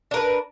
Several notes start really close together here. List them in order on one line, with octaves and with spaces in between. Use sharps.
D4 A#4 B4